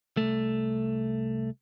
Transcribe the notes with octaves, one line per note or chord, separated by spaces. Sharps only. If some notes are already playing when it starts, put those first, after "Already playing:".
C2 A3